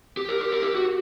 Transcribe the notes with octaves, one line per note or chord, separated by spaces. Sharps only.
G4
A#4
G4
A#4
G4
F#4